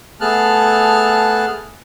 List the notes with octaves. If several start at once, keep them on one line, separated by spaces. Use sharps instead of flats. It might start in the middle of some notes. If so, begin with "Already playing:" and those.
A3 B3 G#4 A5 F6 F#6